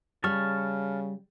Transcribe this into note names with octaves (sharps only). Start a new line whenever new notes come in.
C#3 G3 A5 C#6 F6